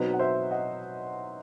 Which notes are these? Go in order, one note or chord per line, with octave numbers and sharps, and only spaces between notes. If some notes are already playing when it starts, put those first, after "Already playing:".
Already playing: B2 F#3 C4 D#4 B4 D#5
F#5
C5 E5
D#5 F#5